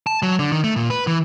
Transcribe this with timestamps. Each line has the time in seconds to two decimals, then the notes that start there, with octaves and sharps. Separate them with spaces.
0.07 A5
0.23 F#3
0.39 D3
0.52 D#3
0.64 A3
0.76 A#2
0.90 B4
1.07 E3